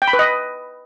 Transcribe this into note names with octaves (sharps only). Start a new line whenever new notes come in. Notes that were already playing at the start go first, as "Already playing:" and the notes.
G5
B5
B4
D#5